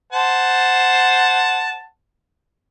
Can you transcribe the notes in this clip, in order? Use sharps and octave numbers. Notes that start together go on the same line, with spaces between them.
C5 F#5 A5